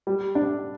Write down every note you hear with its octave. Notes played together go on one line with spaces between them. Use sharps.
G3
D4